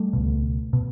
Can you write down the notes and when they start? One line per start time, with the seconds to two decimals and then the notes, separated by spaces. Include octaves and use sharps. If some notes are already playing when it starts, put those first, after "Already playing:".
Already playing: G3 A3
0.13 C#2 B2
0.73 B2